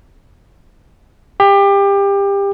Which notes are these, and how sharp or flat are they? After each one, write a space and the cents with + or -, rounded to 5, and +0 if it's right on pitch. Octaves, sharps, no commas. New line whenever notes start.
G4 +25